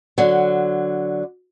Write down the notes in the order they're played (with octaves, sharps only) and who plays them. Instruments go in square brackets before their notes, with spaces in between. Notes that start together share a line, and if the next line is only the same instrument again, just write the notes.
[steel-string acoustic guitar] D3 F#3